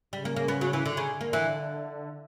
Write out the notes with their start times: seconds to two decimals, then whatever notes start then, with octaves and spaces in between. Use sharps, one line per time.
0.13 C#3 G3
0.25 A#3
0.36 A#3
0.48 B3
0.61 F#3
0.73 E3
0.85 D3
0.97 C#3
1.08 D3
1.21 A#3
1.33 E3